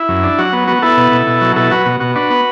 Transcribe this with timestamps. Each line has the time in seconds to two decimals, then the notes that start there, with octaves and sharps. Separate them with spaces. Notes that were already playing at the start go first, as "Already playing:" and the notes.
Already playing: E4
0.08 F#2
0.23 D4
0.38 F#3 F#4
0.53 B3
0.67 B3 F#4
0.82 B3 E4 A4
0.97 B2
1.12 B2
1.27 B2
1.41 F#3
1.56 B2 E4 A4
1.71 F#3 F#4 B4
1.86 B2 F#4
2.00 B2 F#4
2.15 D4 F#4 B4
2.30 B3